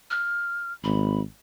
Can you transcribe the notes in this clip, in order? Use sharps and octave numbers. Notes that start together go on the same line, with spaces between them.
F6
G#1 B5